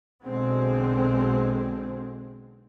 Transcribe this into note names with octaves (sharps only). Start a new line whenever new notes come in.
B1 B2 D3 G#3 C4